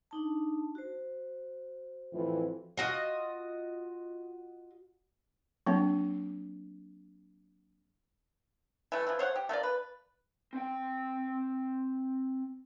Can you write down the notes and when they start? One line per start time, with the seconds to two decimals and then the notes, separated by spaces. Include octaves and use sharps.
0.11 D4 D#4 A5
0.75 F#4 C5
2.13 F2 A2 E3
2.77 F4 F#4 D#5
5.66 F#3 A#3 C4 D4
8.92 E3 A3
9.07 E3 F3
9.19 C5 C#5 E5 F#5
9.36 G4
9.49 A3 A#3 F4 D5
9.63 B4
10.53 C4 G5